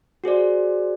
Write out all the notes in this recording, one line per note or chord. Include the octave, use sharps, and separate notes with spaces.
F#4 G#4 C5 D5